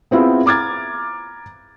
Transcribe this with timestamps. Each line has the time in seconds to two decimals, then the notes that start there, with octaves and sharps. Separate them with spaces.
0.11 B3 C4 E4 F4 G#4
0.46 A#5 D6 F6 G#6 A6